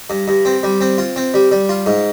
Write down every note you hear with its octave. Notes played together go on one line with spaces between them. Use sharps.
G2
G2
C4
G3
C4
F4
C4
G3
G3
F4
G#2